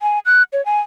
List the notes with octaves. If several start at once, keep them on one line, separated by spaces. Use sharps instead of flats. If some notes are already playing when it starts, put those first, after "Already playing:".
G#5
F#6
C#5
G#5